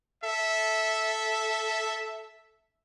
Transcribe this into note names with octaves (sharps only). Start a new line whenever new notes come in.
A4 E5